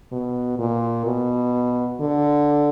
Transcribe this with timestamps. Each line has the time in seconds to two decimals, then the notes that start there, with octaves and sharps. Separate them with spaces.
0.12 B2
0.59 A#2
1.06 B2
2.00 D3